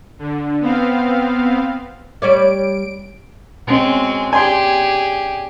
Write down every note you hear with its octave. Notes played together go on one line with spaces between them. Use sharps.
D3
B3 C4 F5
G3 C#5 D5 D7
B2 G#3 C4 C#4
G4 G#4 D5 G#5 C6